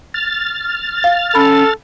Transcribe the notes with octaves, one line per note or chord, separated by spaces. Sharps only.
F6 A6
F5
C#4 A4 B5